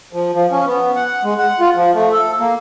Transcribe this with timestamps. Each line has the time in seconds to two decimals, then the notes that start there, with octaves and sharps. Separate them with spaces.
0.13 F3
0.35 F3
0.51 C#4
0.65 B3
0.96 F#5
1.24 G#3
1.39 F#5
1.60 F4
1.75 F3
1.94 A3
2.12 A4
2.39 A#3